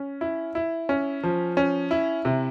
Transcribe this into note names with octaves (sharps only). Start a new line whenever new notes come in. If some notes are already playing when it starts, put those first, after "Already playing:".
Already playing: C#4
E4
E4
C#4
F3
C#4
E4
C3